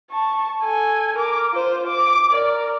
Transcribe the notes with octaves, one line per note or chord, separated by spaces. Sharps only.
A5 C#6
A4 G#5
A#4 D6
F4 C5
D6
A#4 D5